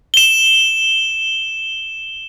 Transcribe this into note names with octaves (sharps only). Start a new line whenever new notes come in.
E7 G7